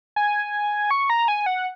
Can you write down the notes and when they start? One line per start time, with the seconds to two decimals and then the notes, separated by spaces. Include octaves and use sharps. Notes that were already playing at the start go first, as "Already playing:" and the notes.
0.16 G#5
0.91 C#6
1.10 A#5
1.28 G#5
1.46 F#5